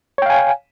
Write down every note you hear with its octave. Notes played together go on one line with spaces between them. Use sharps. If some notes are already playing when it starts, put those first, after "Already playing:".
C#5 F5 G5 G#5